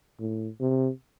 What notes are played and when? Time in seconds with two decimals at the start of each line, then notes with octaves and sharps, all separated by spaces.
0.20 A2
0.61 C3